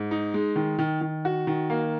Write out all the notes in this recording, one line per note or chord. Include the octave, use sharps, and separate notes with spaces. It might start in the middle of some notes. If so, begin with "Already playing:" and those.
Already playing: G#2
D#4
G#3
D#3
D#3
D#3
F#4
D#3
A#3